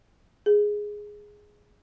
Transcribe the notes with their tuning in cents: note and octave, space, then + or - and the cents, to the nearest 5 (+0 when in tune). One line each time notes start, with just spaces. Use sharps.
G#4 +0